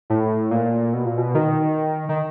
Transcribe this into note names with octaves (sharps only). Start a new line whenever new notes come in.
A2
A#2
B2
A#2
B2
D#3
D#3